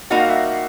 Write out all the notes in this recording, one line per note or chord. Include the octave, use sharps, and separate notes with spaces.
G3 A#3 D#4 F#4 F#5
F5
E5 F#5